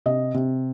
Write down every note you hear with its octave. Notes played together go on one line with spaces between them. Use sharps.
C3 D#5
C3